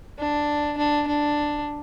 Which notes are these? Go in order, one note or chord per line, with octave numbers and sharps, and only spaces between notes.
D4
D4
D4